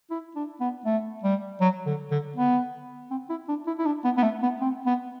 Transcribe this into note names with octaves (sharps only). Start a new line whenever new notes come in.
E4
D4
B3
A3
G3
F#3
D3
D3
B3
C4
E4
D4
E4
E4
D4
B3
B3
A3
B3
C4
B3